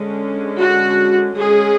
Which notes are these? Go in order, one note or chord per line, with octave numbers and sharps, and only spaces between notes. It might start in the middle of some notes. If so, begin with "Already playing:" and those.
Already playing: D3 G#3 C#4
F#4
G#3 C#4 G#4